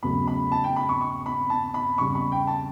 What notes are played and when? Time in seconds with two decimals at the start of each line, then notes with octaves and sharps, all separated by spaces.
0.03 E2 C#3 F#3 A3 B5
0.27 B5
0.52 A5
0.64 G5
0.76 B5
0.89 C#6
1.01 C#6
1.26 B5
1.50 A5
1.74 B5
1.98 E2 C#3 G3 C#6
2.15 B5
2.32 G5
2.47 A5